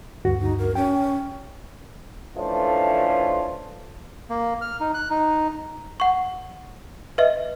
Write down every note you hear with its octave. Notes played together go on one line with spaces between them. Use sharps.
D2 G2 F#4
D#4
A#4
C#4 G5
E3 F3 A3 C#4 D4 F4
A#3
F6
D#4
F#6
D#4
F#5 C#6
B4 D#5 E5